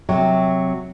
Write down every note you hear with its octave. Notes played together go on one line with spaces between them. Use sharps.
C3 F#3